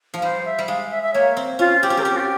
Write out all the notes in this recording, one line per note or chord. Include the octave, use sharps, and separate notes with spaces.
F3
G3 C5
E5
G3
G#3 F5
E5
E5
A#3 C#5
C4
C#4 F4
C4 G4
C#4
C4 A#4
C#4 G4
F4
G4